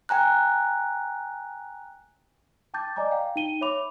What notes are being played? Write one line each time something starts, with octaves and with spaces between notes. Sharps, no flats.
G5 G#5 A#5 F#6
G5 A5 D6 G6 A6
D5 D#5 G#5 A#5 D6
F5 G5
D#4 G5 D#7 G7
C#5 E5 B5 D6 F7